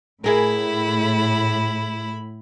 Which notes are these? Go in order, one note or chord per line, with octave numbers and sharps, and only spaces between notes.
A2 E4 G#4 A#4 B5